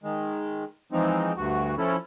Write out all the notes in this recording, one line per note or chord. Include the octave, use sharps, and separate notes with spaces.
D#3 G#3
E3 F3 G#3 C4 D#4
D2 G2 F#4
F3 C#4 E4 A4